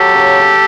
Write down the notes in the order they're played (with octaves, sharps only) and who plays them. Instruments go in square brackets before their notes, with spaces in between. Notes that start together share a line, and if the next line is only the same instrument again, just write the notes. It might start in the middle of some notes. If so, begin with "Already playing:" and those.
Already playing: [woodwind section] F#3 G4 A4
C#3